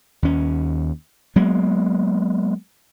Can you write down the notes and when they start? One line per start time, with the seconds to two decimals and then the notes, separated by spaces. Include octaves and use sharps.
0.22 D#2 C#4
1.36 F#3 G#3 A#3 B3